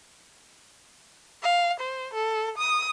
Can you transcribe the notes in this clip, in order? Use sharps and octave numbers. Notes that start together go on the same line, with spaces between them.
F5
C5
A4
D#6